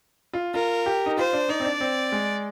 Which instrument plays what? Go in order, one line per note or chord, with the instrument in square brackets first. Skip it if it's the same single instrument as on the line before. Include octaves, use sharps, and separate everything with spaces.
[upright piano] F4
[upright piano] F4 [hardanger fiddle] A#4
[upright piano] G4
D#4
[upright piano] F4 [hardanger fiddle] C5
[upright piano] D4
[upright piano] D#4 [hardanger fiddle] D5
[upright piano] C4
D4
C4
G#3